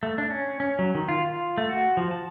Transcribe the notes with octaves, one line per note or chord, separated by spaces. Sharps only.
A3
D4
C#4
C#4
F#3
D#3
F4
F4
A3
F#4
F3
A5